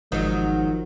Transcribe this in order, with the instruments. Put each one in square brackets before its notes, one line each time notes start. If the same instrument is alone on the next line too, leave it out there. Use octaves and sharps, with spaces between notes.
[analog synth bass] G#1 [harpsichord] G#2 [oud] D#3 F#3 [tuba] F3